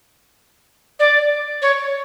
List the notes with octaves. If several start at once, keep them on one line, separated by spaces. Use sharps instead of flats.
D5
C#5